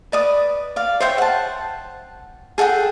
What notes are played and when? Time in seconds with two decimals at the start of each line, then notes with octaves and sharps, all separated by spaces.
0.12 B4 D5 D#6
0.76 D5 F5
1.00 C5 C#5 E5 G5
1.18 F#5 A5
2.58 G#4 A4 F#5 G5